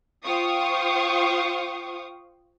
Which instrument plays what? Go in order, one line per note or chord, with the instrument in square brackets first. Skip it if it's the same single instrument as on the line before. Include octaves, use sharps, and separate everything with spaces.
[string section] F4 C5 F5 G5 C#6 D#6